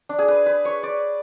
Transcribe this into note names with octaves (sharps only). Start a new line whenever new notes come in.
D4
G#4
B4
B4
C#5
D5